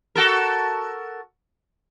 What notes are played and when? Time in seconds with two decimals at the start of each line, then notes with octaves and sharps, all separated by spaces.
0.15 F#4 A4 A#4